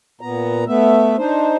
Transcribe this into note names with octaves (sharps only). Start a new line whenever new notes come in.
A#2 B3 A#5
A3 B3 E5
D4 D#4 C5